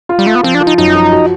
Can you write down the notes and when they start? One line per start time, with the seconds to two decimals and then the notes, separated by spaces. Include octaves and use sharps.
0.09 F4
0.19 G3
0.26 A3 F4
0.35 B3
0.43 F3 C4
0.55 D4
0.61 F3
0.67 D#4
0.78 F#2 D#4
0.95 F3
1.12 F#4